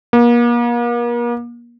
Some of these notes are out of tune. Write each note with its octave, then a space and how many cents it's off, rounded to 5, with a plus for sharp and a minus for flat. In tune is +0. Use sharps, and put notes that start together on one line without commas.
A#3 +40